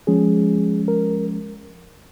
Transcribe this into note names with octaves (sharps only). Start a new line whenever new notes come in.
F3 G#3 C#4 G#4
A#4